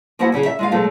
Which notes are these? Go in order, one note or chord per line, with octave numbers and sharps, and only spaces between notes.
F3 A#3 B3 E4 F#4 F#5
F#2 C#3 C#4 G#4
E5
G#3 F4 F5
B2 F#3 G#3 A3 B3